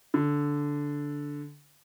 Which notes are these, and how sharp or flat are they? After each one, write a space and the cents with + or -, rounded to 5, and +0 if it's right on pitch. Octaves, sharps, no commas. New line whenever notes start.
D3 -10